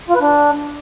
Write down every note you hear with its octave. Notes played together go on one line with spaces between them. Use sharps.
F4
B4
D4